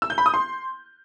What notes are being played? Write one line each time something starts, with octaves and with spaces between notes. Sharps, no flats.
E6
G6
B5
D#6
C6